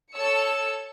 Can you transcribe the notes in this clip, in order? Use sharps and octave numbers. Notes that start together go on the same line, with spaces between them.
A4 C#5 E6 C#7